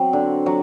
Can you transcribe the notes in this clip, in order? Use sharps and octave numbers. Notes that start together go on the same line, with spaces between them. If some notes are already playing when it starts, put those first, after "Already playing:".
Already playing: F#3 C4
D3
F#3